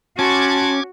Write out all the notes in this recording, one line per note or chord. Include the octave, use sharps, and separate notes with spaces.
C#4 F#4 A5 C6 D6 G#6